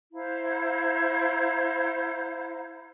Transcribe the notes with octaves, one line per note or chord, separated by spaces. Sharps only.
E4 C5 F5 A#5